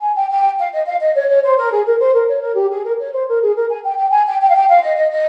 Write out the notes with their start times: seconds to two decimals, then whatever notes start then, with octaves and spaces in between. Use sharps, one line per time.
0.01 G#5
0.16 G5
0.30 G5
0.58 F5
0.72 D#5
0.86 F5
1.00 D#5
1.14 C#5
1.28 C#5
1.42 C5
1.58 A#4
1.71 G#4
1.85 A#4
2.00 C5
2.14 A#4
2.29 C#5
2.42 A#4
2.56 G4
2.71 G#4
2.84 A#4
2.98 C#5
3.13 C5
3.28 A#4
3.42 G#4
3.56 A#4
3.70 G#5
3.83 G5
3.97 G5
4.11 G#5
4.27 G5
4.41 G5
4.49 F5
4.55 G5
4.69 F5
4.83 D#5
4.96 D#5
5.11 D#5